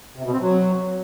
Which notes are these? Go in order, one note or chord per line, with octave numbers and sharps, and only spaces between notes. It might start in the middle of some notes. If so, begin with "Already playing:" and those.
C3
B2
C4
F#3